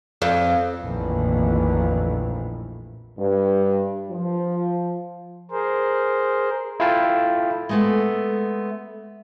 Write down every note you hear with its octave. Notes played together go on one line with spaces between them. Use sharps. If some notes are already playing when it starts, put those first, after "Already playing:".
F2
A#1 F2 A2 D#3 E3
G2
F3
G#4 A#4 C5
E4 F4 A4 F5 G5 A5
G#3 A3 B3